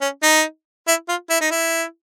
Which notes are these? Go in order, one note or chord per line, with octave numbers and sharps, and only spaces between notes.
C#4
D#4
E4
F4
E4
D#4
E4